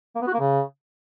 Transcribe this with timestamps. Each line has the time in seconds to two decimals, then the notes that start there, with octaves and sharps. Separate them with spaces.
0.15 A#3
0.22 B3
0.28 F#4
0.34 A#3
0.40 C#3